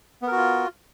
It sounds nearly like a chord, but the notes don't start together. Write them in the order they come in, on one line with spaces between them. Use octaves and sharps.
B3 A#4 F#4 F4